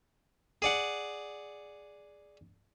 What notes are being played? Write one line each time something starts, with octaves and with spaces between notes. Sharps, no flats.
G#4 D5 F#5